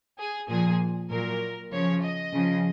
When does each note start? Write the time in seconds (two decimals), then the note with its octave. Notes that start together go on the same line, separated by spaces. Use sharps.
0.19 G#4
0.49 A#2 F3 G#4
1.10 A#2 F#3 A#4
1.72 C#3 F3 C#5
2.03 D#5
2.33 C#3 F3